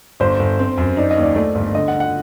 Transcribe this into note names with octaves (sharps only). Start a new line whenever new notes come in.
G1 C5
G1
C4
F#2
D#4 D5
D#5
D#2
D5
A3 D5
G1
D3 D#5
F#5
D3
F#5